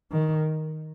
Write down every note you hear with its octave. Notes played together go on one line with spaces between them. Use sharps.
D#3